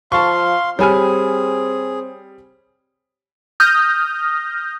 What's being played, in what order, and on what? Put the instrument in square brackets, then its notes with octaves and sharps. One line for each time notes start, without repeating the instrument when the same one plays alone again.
[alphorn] F3 [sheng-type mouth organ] F5 C6 [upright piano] A5 C#6
[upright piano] G3 G#5 F6 [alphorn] C4 [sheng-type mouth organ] G#4 [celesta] C#5 B5
[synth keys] D#6 F6 G6 A#6